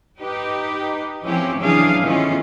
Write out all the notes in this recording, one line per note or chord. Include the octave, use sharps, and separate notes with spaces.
D#4 G4 B4
E3 F3 C4 C#4 E4 G4
C#3 E3 F#3 D4 G#4 F5
D#3 E3 A3 B3 C#4 F4